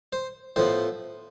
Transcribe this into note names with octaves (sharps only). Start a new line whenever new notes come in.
C5
A2 F3 B3 C5